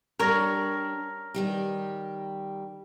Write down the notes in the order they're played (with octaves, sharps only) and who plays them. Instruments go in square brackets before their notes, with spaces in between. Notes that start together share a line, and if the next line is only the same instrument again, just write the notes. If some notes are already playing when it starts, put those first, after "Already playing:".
[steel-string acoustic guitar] G3 D4 [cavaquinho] A#4 C#5 [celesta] A#5 F6 A#6
[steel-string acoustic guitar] D#3 G3 G4